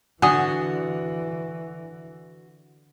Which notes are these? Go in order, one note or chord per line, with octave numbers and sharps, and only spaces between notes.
D3 E3 F#4 F#5 G#5 D#6